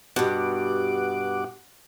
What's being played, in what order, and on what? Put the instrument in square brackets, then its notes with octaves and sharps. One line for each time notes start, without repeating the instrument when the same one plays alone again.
[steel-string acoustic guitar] G2 B2 [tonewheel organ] F#4 F#5 D6